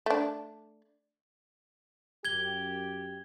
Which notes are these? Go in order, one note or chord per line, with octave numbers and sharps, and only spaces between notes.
A3 D4
F#2 G4 G#6 G7